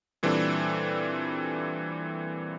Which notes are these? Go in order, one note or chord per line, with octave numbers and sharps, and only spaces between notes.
A#2 E3 G3 C4 D4 A4